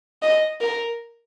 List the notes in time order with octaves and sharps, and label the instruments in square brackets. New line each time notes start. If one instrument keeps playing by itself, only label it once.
[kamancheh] D#5
A#4